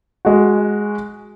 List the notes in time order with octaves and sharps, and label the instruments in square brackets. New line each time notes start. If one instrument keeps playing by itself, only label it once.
[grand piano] G#3 F#4